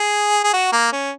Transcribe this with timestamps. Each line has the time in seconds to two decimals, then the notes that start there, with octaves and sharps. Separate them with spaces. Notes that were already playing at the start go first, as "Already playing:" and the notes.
Already playing: G#4
0.44 G#4
0.53 F#4
0.72 A#3
0.92 C#4